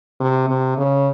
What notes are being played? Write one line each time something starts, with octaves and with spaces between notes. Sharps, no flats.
C3
C3
C#3